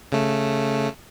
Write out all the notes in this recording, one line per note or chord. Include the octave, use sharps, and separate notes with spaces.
C#3 A3